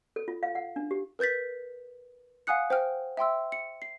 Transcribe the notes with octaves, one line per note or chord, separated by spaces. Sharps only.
A4
F4
F5
F#5
D4
G4
A#4 B4 G6 A6 B6
F5 F#5 G#5 D#6 F#6 C#7
C5 G5 F6
E5 G5 C6 E6
C#7
C7